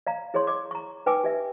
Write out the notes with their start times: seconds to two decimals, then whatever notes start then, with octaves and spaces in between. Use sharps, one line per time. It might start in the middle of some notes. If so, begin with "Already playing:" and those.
0.07 D5 F5 A#5
0.34 E4 G#4 C#5 D5 C6 C#6
0.47 D5 D6
0.71 A#5 C#6
1.06 D#4 B4 G5 G#5 D6 E6
1.24 G4 D5 E5